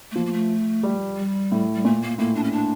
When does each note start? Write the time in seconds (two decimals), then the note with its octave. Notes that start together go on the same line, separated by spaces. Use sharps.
0.11 A3
0.15 F3 A#3
0.26 A#3
0.33 A3
0.83 G3
1.17 G3
1.52 A2
1.74 G3
1.85 A#2 A3
2.02 A#3
2.18 A2 A#3
2.35 D4
2.44 C#4
2.51 D4